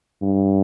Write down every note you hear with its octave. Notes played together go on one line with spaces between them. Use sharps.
G2